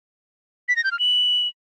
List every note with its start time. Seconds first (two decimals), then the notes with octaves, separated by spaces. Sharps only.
0.69 B6
0.76 A#6
0.84 G6
0.92 F6
0.99 F#7